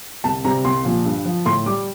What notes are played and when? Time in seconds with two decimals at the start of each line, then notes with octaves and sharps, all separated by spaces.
0.24 C2 A5
0.44 C3 G3 A#5
0.65 C2 C6
0.85 A#2 F3
1.05 G2
1.25 F3
1.46 A2 C6
1.66 G3 D6